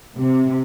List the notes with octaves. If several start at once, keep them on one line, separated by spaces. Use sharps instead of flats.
C3